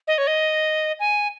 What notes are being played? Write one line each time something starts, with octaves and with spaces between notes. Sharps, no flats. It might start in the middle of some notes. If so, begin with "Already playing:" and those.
D#5
C#5
D#5
G#5